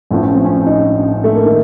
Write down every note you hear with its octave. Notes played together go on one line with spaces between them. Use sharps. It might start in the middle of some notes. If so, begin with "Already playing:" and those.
A1 A2 F3 D4
C#4
C4
C#4
D4
D#4
C#4
D4
C#4
A3
A#3
D#3